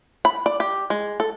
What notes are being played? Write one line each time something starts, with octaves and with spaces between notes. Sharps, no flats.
B5
D5
G4
G#3
A4